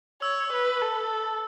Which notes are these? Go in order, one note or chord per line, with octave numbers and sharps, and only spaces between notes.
C#5 E6
B4
A4